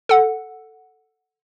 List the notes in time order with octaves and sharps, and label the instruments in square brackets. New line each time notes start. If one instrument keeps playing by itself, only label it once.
[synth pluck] A4 F#5